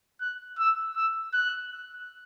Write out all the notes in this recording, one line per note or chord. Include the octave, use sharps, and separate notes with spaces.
F#6
E6
E6
F#6